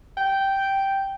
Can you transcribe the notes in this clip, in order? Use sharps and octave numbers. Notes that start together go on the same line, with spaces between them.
G5